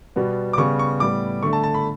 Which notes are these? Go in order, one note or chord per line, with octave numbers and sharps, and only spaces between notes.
B2 G3 B3
D6
C#3 G3 B3 C#6
C#6
A2 G3 B3 D6
D3 A3 C#6
A5
A5
B5